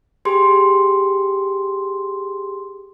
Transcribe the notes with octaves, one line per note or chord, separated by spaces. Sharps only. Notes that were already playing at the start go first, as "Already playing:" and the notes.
G4 G#4 C6